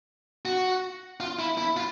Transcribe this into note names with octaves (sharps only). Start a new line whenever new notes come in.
F#4
F4
E4
E4
F4